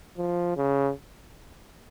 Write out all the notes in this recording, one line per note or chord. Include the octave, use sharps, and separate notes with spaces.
F3
C#3